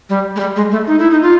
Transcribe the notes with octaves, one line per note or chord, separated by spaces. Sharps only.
G3
G#3
G3
G#3
A3
D#4
E4
D#4
F4